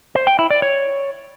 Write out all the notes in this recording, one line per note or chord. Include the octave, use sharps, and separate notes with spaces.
C5
G5
E4
D5
C#5